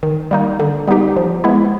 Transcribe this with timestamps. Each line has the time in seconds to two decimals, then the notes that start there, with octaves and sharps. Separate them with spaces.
0.03 D#3
0.31 G3 A#3 D#4
0.60 D3
0.87 G3 B3 D#4 G4
1.17 F3
1.44 G#3 B3 E4